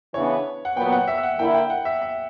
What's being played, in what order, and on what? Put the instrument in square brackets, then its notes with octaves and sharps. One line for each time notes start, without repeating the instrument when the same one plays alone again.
[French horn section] C#3 E3 B3 D4 [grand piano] C#5
[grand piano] F#5
[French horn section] A#2 F#3 B3 [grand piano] G5
[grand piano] F#5
E5
E5
F#5
[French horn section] D3 A#3 E4 [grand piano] G5
[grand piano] G5
F#5
E5
E5